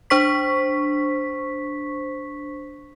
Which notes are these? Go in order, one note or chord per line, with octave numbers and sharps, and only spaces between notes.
D4 C5 C#6 B6